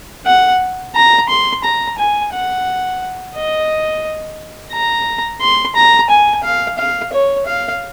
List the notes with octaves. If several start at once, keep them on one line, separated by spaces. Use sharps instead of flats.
F#5
A#5
C6
A#5
G#5
F#5
D#5
A#5
C6
A#5
G#5
F5
F5
C#5
F5